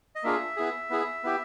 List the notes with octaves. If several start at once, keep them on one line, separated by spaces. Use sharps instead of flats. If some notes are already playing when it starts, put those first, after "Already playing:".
D#5
A#3 D4 F4 G#4 E5
B3 E4 G#4
B3 E4 G#4
B3 E4 G4